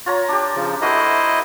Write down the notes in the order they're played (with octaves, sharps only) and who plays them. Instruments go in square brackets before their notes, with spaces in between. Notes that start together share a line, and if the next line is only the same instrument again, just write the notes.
[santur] F4 C#5 A#5
D4 G4
[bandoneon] C#3 F3
[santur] A3 F#4 A#4 [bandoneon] E4 C5 D#5